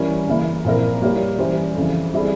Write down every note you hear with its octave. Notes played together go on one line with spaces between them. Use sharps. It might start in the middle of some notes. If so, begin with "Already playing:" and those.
Already playing: E3 G3 C#4 E4 A#4
C#3 E3 A#3 E4
A#2 F3 C4 E4 A#4
G3 A#3 E4 G4 C#5
E3 G3 C#4 G4 C5
F2 C#3 E3
G3 C4 E4 G#4